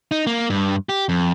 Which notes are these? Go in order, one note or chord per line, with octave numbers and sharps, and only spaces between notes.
D#4
A#3
G2
G4
F2